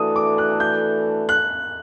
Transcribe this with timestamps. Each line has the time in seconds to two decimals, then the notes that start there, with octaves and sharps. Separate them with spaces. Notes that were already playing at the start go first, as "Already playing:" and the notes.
Already playing: E3 A3 D4 F#4 A4 D#6
0.16 D6
0.38 F#6
0.60 G6
1.29 F#6